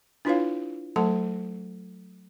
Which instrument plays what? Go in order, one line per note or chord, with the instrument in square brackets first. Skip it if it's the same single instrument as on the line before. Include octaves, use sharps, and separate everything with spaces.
[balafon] D4 E4 F4 B4 C#5 F5
F#3 A3 A4 F#5 A5